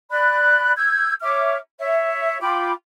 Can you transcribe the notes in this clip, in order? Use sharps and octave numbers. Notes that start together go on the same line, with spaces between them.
D5 B5 F#6
E6 G6 G#6
C#5 E5 D6 F6
C#5 E5
F4 G5 B5 D6